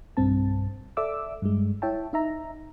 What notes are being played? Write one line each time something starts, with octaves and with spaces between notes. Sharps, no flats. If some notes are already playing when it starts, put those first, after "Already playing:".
B1 G2 C4 A5
A4 D5 E5 D6 E6
G2 G#3
E4 C#5 E5 G5 A5
D#4 E5 A#5